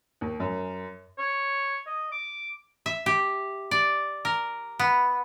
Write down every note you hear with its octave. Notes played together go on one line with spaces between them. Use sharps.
D#2
F#2
C#5
D#5
D6
E5
G4
D5
A#4
B3